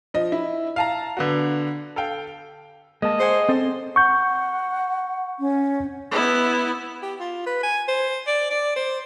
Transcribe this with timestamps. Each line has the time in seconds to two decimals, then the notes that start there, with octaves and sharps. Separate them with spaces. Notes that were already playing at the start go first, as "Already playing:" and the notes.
0.14 F3 D#5
0.32 E4
0.76 F5 A5 A#5
1.17 D3 B3 F#4
1.96 A4 F5 G5
3.02 G#3 A#3 D#5 A5
3.20 G#4 C5 F#5 G#5
3.49 C4 A4 C5
3.96 F#5 C#6 G6
5.40 C#4
6.11 B3 E4
7.03 G4
7.20 F4
7.46 B4
7.63 G#5
7.88 C5
8.27 D5
8.50 D5
8.76 C5